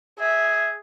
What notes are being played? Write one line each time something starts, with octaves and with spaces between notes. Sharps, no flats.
G#4 E5